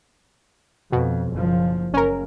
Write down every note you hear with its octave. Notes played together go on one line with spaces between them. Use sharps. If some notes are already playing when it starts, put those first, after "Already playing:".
F2 B2
F#1 F3
F#1 C#4 A#4